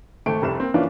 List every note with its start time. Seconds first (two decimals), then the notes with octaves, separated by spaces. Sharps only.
0.26 G#1 A3 D7
0.42 F1 C2 A4 E7
0.60 A#3 C4
0.74 E3 F3 A#3 C#4 D4 F4